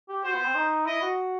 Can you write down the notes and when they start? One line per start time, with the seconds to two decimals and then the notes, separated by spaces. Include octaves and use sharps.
0.09 G4
0.24 F#4 C5
0.35 B3
0.45 C4
0.55 D#4
0.86 E4 D#5
1.02 F#4